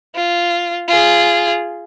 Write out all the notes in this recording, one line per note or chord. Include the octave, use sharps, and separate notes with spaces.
F4
F4 G#4